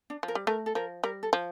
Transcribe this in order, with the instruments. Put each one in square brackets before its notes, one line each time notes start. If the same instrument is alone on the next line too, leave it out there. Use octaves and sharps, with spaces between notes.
[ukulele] D4
[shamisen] F3
[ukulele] A#4
[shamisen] G3
[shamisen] A3 [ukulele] A#4
[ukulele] A4
[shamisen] F3 [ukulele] A#4
[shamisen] G3 [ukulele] A#4
[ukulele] A4
[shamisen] F3